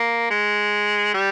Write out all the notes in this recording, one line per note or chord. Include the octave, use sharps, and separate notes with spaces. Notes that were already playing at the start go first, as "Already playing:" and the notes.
Already playing: A#3
G#3
G3